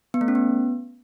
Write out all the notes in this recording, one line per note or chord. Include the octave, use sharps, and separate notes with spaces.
B3
A3
C#4
B3